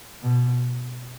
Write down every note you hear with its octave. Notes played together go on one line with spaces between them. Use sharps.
B2